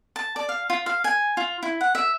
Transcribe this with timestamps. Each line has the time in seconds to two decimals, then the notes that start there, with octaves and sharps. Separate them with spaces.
0.16 A5
0.36 D5
0.49 F5
0.70 F4
0.86 F5
1.04 G#5
1.37 F4
1.63 E4
1.81 F#5
1.95 E5